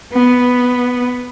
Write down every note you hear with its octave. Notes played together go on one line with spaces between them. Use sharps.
B3